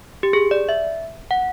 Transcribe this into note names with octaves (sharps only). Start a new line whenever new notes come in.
G4
G#4
D5
E5
F#5